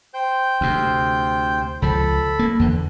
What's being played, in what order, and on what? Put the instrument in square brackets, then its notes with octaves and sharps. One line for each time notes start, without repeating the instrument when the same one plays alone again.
[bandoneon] C5 G5 G6
[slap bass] D2 C3
[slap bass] C#2 F3 [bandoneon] A4 B5
[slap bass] A#3
E2 D3